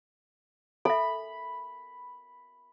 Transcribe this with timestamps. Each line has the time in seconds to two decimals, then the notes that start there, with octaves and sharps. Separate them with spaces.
0.85 A4 E5 B5